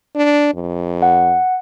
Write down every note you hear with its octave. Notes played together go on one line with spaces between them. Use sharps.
D4
F2
F#5